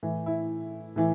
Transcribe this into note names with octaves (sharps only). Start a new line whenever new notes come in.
A2 E3
E4
A2 E3